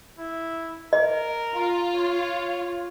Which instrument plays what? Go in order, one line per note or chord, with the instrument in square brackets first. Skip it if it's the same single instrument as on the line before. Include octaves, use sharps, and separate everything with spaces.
[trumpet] E4
[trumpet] A#4 [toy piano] D#5
[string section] F4
[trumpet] C#5